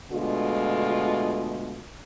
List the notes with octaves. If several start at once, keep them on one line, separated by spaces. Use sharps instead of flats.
B2 D3 G#3 A3 F4